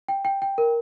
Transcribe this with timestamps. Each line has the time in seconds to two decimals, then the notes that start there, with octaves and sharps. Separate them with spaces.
0.08 G5
0.25 G5
0.42 G5
0.58 A#4